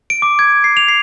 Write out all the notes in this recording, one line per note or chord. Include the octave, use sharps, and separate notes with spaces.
D7
D6
G#6
C7
F7
C7